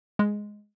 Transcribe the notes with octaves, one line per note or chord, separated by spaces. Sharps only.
G#3